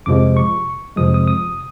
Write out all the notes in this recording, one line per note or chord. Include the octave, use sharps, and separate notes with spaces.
F2 C3 F3 G#3 D6
C#6
F2 C3 F3 G#3 D#6
D#6
D#6